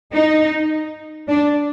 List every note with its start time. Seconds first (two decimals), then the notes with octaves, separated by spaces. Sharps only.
0.13 D#4
1.28 D4